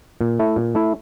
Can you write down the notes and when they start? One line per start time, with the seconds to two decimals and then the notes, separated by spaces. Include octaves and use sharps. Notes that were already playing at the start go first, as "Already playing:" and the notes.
0.21 A#2
0.39 A3 E4
0.56 A#2
0.75 A3 E4